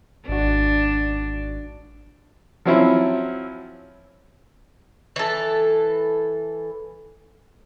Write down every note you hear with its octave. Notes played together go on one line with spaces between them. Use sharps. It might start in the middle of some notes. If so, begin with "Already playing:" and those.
G#1 D4 F#4
F3 F#3 C4 C#4 E4
E3 A4